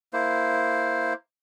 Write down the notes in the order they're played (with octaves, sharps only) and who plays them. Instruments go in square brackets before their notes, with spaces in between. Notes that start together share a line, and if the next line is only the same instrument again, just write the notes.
[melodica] A#3 E4 C5